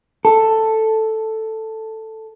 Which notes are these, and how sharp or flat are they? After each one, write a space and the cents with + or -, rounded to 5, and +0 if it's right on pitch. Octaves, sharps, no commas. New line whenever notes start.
A4 +5